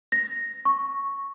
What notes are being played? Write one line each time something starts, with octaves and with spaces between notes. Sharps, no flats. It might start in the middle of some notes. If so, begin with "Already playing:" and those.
A#6
C#6